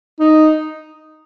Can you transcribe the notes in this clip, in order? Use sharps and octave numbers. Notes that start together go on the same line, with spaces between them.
D#4